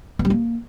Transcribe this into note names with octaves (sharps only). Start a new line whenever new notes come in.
B3
G3
A#3